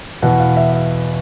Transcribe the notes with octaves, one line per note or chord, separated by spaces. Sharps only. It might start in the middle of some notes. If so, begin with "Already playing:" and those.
E2 B2 F#5
F5
E5
E5